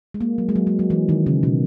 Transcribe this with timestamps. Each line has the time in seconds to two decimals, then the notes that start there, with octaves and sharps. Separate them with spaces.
0.14 G#3
0.21 A#3
0.38 F#3
0.49 G#3
0.56 F#3
0.67 G#3
0.79 F#3
0.90 E3
1.09 D#3
1.26 C#3
1.43 B2